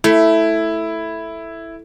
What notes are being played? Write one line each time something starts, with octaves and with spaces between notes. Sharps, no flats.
A3 E4